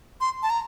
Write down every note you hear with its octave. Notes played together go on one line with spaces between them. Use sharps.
C6
A5
A#5